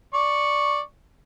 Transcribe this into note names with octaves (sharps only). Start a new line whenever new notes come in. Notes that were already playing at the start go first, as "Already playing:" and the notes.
D5 C#6